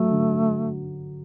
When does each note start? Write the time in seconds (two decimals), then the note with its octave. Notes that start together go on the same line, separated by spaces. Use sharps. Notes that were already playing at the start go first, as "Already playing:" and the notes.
Already playing: F#3 A3
0.10 D3